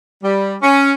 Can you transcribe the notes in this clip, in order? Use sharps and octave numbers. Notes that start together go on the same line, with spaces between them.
G3
C#4